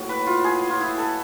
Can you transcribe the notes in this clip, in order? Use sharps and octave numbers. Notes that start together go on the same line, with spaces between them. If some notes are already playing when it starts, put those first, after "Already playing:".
Already playing: A2 F#3 A#3
B4
F4
G#4
F4
E4
A4